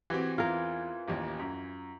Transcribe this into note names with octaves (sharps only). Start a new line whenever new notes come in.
E3 C4 F#4 G4
E2 F4 A#4
A1 D#2
F#2